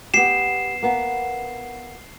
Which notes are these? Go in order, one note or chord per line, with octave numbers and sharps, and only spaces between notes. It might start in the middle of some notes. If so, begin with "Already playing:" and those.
B3 G4 C7 E7
A#3 B3